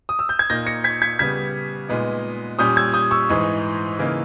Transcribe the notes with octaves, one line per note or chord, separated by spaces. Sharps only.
D#6
E6
G6
G#6
A#2 A#3 D#4 G6 A#6
A#6 C#7
G#6 B6
G#6 B6
C#3 G3 B3 G#6 B6
A#2 G#3 B3 D#4
A#2 G3 C#4 D#6 G6
E6 G#6
D#6 G6
C#6 E6
G#2 E3 G#3 D#4
C#3 E3 A#3 D#4